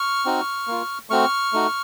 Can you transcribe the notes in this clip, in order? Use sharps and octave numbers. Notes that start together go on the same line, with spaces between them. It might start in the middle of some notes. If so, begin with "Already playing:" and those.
Already playing: C#6 F6
C4 D#4 F#4
A#3 F4
A3 C4 F#4 C#6 F6
A3 D#4 F#4